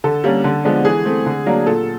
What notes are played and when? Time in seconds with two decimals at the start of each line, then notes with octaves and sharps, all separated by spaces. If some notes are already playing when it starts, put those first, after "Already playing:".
0.04 D3 A4
0.24 G3 A#3 C#4
0.44 D3
0.64 F3 G#3 B3 D4
0.85 E3 G#4
1.05 A3 C4
1.26 D3
1.46 F#3 A#3 D4
1.66 A#2 A4